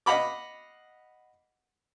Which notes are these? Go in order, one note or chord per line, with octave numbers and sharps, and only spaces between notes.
D#5 F5 F#5 B5 D6